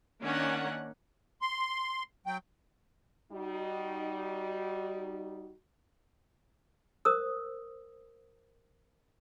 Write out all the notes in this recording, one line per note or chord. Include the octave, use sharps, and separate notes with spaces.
D#3 A#3 C#4 D4 F#5
C6
F#3 G5
G3 D#4 F#4
A#4 C5 D#6 E6